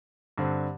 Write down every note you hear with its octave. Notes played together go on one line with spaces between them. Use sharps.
G2 D3 C4